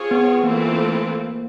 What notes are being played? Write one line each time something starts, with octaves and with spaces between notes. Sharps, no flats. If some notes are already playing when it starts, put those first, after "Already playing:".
Already playing: C4 F4 G#4 C#5
B3
E3 A3 A#3 C4 F4 A4